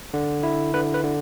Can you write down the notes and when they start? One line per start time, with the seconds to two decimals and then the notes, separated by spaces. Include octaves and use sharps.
0.14 D3
0.43 E4
0.74 D3 B4
0.94 B4
1.04 D3